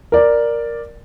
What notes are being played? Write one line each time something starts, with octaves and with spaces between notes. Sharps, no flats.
A#4 D5